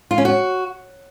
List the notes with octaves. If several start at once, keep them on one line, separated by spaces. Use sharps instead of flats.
F4
C#4
F#4